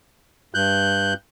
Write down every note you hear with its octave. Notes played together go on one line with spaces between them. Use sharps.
G2 F#6 G6